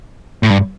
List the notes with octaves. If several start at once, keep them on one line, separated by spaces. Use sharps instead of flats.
A2
G2